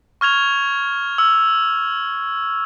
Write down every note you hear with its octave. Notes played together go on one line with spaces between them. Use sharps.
C#6 F6 G#6 F7
E6